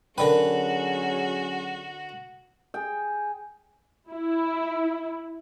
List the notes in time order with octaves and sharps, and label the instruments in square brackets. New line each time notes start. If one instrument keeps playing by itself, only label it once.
[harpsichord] D3 B4 [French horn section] F#3 C#4 G#4 [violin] F#4 [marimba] A#4 G5
[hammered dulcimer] G#4 G5
[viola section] E4